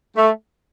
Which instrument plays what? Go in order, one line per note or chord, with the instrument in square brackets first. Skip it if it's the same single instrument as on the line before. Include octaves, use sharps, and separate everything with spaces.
[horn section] A3